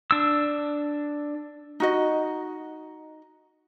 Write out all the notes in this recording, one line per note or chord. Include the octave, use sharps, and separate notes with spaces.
D4 E6
D#4 F#4 D#5